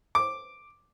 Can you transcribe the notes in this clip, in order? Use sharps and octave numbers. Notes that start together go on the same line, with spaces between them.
D6